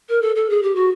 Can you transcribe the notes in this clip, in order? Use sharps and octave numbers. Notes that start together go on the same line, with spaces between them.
A#4
A4
A4
G#4
G4
F#4